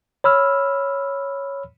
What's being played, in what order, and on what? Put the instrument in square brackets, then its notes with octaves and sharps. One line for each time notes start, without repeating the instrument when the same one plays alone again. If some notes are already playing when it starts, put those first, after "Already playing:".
[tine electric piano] C#5 B5 E6 F6